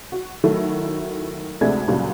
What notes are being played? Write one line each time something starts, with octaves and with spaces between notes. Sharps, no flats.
F#4
D#3 F#3 A3 E4 A4
D2 C3 G#3 A3 D4 G#6
D2 A#2 C#3 F#3 G3